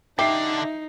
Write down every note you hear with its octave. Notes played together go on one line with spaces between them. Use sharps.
D3 D4 D#4 G4 E5 C7